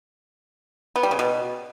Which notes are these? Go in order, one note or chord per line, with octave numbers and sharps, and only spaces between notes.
B3
G3
C#3
B2